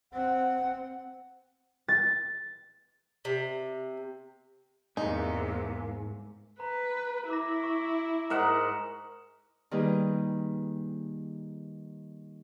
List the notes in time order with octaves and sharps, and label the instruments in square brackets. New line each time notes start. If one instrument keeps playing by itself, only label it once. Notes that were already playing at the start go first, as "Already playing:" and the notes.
[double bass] C4 [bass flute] F#5
[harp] A6
[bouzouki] C3
[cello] E2 C3 [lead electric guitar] G#2 [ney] A#3 [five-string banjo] D#4
[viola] B4 [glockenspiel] A#5
[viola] E4 [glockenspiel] D6 A#6
[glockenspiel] C#6
[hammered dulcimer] G#2 A#4 F#5 [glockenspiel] A#5 E7 F#7
[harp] D#3 G3 A#3 G#4 B4